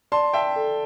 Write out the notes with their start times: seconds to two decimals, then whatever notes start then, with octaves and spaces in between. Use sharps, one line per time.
0.12 D5 A5 C6
0.33 E5 G5 A5
0.56 A4